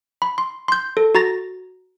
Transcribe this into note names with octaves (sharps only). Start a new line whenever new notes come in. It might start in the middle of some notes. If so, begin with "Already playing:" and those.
B5
C6
C6 G6
A4
F#4 A#5 A6 A#6